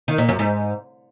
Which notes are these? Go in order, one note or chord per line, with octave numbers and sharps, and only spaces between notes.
D#3
A#2
F#2
G#2